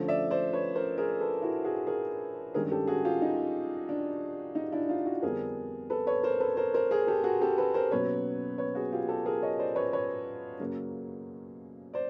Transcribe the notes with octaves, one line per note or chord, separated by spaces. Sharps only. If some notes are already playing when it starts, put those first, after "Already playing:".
Already playing: D3 F3 A3 C#4
D5 E5
C5 D5
B4 C#5
A#4 C5
G#4 A#4
A4 B4
E4 F#4
F#4 G#4
G#4 A#4
G2 D#3 G#3 C#4 G#4 A#4
G4 A4
F#4 G#4
F4 G4
D#4
D4
D#4
D4 E4
D#4 F4
E4 F#4
F2 D3 G3 B3 D4 G#4 A#4
A4 B4
B4 C#5
A#4 C5
A4 B4
A#4 C5
A#4 C5
G#4 A#4
G4 A4
F#4 G#4
G4 A4
A4 B4
A#4 C5
B2 F#3 A#3 C#4 B4 C#5
B4 C#5
F#4 G#4
F4 G4
G4 A4
G#4 A#4
C#5 D#5
C5 D5
B4 C#5
B4 C#5
F#2 C#3 F#3 A#3
C5 D5